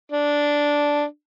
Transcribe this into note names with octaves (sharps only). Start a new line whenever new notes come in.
D4